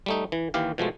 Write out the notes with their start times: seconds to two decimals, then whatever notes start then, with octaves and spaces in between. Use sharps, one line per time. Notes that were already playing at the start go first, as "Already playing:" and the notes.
0.06 G3 A3 D#4
0.32 E3
0.54 D#2 E3 G4 F5
0.78 B2 F3 G#3 A3